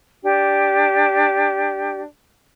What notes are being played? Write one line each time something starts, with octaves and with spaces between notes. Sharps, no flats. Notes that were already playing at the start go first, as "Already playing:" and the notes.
D4 G4